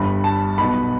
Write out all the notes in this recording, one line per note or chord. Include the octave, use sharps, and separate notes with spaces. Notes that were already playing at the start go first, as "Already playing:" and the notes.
Already playing: G1 G2 G3 B5
A5
B1 B2 B3 B5